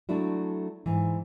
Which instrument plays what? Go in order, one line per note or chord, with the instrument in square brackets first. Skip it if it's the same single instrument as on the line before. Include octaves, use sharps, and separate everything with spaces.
[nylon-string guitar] F#3 A3 D4 E4 F#4
G#2 E3